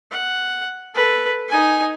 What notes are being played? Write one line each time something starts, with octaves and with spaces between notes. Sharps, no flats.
F#5
A4 B4
D#4 G#5